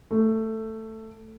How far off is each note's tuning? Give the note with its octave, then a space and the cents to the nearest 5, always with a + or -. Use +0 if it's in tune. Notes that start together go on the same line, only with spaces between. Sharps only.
A3 +10